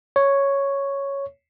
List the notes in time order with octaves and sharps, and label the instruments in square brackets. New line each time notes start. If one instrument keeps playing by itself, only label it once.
[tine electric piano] C#5